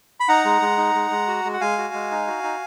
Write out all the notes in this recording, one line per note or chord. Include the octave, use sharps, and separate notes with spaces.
B5
D#4 F#5 A#5
G#3
G#3
D#4
G#3
G#3
F#4
G#3
F#5
G#3 F5 G#5
F#4
G#3
D#4
F#4
D#4